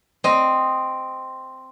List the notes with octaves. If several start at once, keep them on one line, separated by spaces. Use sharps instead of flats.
C4 D#5